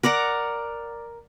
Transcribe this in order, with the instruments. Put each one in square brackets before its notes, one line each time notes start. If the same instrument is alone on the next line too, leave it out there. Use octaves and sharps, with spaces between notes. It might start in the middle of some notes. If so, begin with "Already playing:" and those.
[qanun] A#4 D5 F#5 A#5